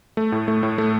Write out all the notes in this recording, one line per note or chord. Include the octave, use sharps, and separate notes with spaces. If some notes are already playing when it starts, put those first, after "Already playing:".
A3
A2
A3
A2
A3